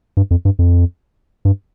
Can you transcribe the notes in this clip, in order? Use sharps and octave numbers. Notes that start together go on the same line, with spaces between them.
G2
F2
G2
F2
G2